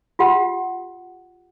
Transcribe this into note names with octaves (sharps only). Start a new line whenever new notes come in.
F4 G4 F#5